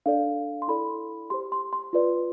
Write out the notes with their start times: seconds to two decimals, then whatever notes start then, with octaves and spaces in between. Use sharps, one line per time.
0.06 D4 A4 D5 F5
0.62 C6
0.68 E4 A4 D5 B5
1.30 G4 C5 C6
1.52 C6
1.73 C6
1.93 F4 B4 D5